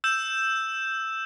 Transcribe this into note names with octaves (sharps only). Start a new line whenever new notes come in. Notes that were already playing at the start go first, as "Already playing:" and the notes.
E6 G6 E7